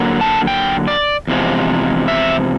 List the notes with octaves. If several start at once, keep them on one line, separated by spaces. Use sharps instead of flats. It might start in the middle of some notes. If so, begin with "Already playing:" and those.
Already playing: D3 F#3 A#3
A5
G5
D5
E2 C3 F3 G#3
E5